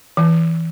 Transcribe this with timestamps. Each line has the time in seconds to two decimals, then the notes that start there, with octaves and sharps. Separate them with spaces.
0.17 E3